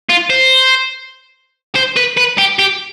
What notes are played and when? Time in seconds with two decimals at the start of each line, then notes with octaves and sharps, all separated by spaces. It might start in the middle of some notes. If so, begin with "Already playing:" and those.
0.09 F4
0.30 C5
1.76 C5
1.97 B4
2.17 B4
2.38 G4
2.59 G4